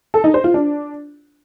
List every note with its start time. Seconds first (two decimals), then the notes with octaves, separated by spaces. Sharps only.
0.14 A4
0.24 D#4
0.34 C5
0.44 F4
0.54 D4